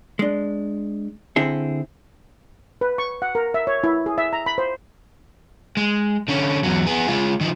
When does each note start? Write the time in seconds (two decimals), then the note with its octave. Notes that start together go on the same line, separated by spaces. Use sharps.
0.19 G#3 D4
1.36 D3 C4 E4 G#4
2.81 B4
2.98 C#6
3.22 F#5
3.35 A#4
3.54 E5
3.67 C#5
3.84 E4
4.06 G#4
4.18 E5
4.33 A#5
4.46 B5
4.58 C5
5.77 G#3
6.28 D3 C#4
6.64 E2 F#3
6.87 B3 G#4
7.08 G#3 F4
7.41 D#3 F3